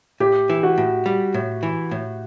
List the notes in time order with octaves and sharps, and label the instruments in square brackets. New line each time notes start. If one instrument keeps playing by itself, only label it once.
[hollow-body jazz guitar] A2 [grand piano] G4
[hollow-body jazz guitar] E3
[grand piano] F#4
[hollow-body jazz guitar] A2
G3
A2
E3
A2